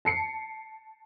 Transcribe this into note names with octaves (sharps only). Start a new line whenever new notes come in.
A5 C7 C#7